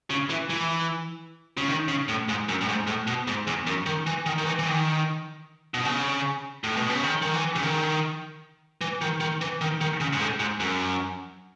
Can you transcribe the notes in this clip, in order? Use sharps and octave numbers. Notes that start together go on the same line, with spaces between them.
C#3
E3
E3
C#3
D#3
C#3
A2
G#2
F#2
A2
G#2
A2
B2
G#2
E2
F#2
D#3
E3
D#3
D#3
E3
E3
D#3
B2
C#3
A2
B2
C#3
D#3
D#3
E3
C#3
D#3
E3
D#3
D#3
E3
D#3
D#3
C#3
G#2
A2
G#2
F#2